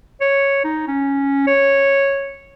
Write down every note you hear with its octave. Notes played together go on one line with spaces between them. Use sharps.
C#5
D#4
C#4
C#5